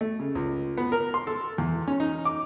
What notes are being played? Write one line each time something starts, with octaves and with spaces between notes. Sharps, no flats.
A3
C#3
C#2
B3
A#4
C6
A4
E2
C#4
D#4
D6